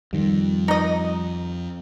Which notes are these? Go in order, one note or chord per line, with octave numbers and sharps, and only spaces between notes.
F2 D#3 G3
D#4 D#5